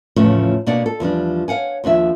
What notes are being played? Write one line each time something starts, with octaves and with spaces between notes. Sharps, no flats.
E2 A2 C#3 F3 A3 C#4
B2 A#3 D4 D5 F#5
A4
E2 F3 G3 D4
C#5 F5 F#5 G#5
D#2 F3 D4 E5